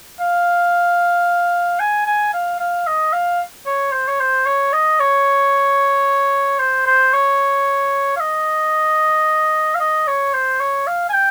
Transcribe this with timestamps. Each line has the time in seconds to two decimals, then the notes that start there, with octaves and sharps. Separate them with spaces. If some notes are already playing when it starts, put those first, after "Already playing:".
0.20 F5
1.79 G#5
2.06 G#5
2.34 F5
2.60 F5
2.87 D#5
3.13 F5
3.66 C#5
3.92 C5
4.08 C#5
4.20 C5
4.46 C#5
4.73 D#5
5.00 C#5
6.59 C5
6.86 C5
7.13 C#5
8.16 F5
8.20 D#5
9.75 F5
9.80 D#5
10.07 C#5
10.34 C5
10.60 C#5
10.87 F5
11.09 G#5
11.13 G5